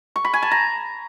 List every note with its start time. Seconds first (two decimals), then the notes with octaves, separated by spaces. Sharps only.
0.16 C#6
0.25 B5
0.33 G#5
0.42 A5
0.51 A#5